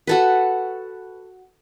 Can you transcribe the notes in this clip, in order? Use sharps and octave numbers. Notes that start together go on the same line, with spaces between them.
F#4 A4 B4